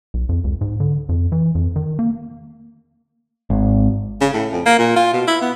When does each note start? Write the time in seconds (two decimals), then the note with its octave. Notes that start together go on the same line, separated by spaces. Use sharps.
0.14 B1
0.29 F2
0.44 C#2
0.61 G#2
0.80 D3
1.09 F2
1.32 E3
1.55 F2
1.76 D#3
1.99 A#3
3.50 G#1
4.21 C#3
4.33 A2
4.53 F2
4.66 A#3
4.79 A#2
4.96 F4
5.13 B2
5.27 E4
5.41 B3